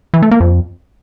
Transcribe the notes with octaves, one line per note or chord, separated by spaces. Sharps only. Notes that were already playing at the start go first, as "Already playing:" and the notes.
E3
A3
A#3
F2